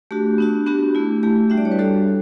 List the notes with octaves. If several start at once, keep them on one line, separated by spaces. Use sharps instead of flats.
A3 D4 F#4 G4
B3 D4 F#4
B3 D4 F#4 G4
A3 E4
A3 E4 G4
G3 D4 F#4 E5
D5
C#5
B4
G3 D4 F#4 A4